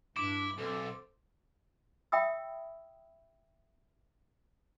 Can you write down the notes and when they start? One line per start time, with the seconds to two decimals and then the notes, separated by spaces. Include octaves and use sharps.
0.16 G2 D4 E4 D6
0.58 B1 C4 A4
2.12 E5 G5 B5 D#6 E6